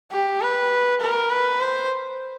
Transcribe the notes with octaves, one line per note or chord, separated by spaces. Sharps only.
G4
B4
A#4
B4
C5